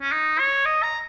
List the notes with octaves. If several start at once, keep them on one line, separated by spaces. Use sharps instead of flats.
C#4
D#4
C#5
D#5
A#5